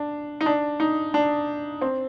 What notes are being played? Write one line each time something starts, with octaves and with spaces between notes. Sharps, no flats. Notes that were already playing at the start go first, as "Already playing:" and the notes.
Already playing: D4
D#4
D4
D#4
D4
C4